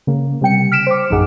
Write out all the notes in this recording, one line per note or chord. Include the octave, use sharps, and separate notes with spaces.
C#3 A#3
C3 G3 G5 C#7
F6 B6 D7 E7
C5 D6
A#1 F#2 D#4 G#4 F#5 F6